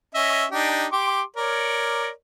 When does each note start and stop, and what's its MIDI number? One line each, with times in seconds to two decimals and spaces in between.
0.15 0.46 61
0.15 0.46 75
0.15 0.46 76
0.51 0.86 62
0.51 0.86 63
0.51 0.86 67
0.93 1.22 67
0.93 1.22 84
0.93 1.22 86
1.36 2.09 70
1.36 2.09 73
1.36 2.09 74